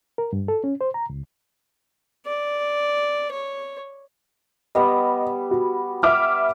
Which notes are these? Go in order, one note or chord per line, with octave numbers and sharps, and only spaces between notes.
A#4
G2
A4
C#4
C5
A#5
C#2
D5
C#5
G3 B3 D#5
F#4
E5 D6 F6